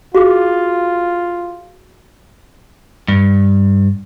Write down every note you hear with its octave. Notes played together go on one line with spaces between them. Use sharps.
F4 F#4 G#4 D6
G2